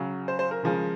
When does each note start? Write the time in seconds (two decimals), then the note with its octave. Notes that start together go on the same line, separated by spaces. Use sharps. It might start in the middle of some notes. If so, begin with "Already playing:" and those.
Already playing: C#3 F#3
0.28 C5
0.39 C5
0.51 A#4
0.63 C#3 F3 G#3